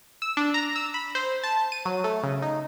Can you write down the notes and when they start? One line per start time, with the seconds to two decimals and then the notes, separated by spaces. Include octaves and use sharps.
0.22 E6
0.37 D4
0.54 A#5
0.76 E6
0.94 B5
1.15 C5
1.44 A5
1.72 D#7
1.85 F#3
2.04 A3
2.23 C#3
2.42 D#4